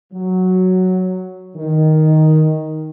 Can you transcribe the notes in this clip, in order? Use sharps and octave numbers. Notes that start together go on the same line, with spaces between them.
F#3
D#3